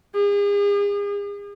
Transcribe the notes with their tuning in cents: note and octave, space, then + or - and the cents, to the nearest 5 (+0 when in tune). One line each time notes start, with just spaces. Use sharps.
G#4 -40